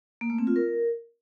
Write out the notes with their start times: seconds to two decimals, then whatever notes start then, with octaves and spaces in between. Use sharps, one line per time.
0.21 A#3
0.30 A3
0.38 C4
0.47 F4
0.56 A#4